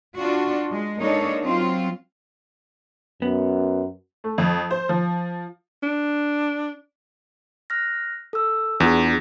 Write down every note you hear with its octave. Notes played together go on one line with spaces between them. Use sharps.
D4 F4 F#4
G#3
G#3 A#3 D4 D#4 A4 C#5
F#3 C4 F4
F#2 B3
A3
F2
C5
F3
D4
F6 F#6 A#6
A4 E6
E2 D4 F4 G#4